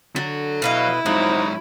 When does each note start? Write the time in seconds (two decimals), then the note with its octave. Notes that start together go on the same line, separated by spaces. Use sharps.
0.16 D3 F#3 F#4
0.62 B2 E4 B4 D#5 F5
1.06 G#2 F3 F#3 C4 D#4 F#5